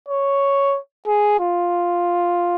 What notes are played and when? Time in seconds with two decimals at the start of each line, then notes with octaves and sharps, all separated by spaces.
0.09 C#5
1.07 G#4
1.40 F4